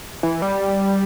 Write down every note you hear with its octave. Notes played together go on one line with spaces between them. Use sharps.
E3
G3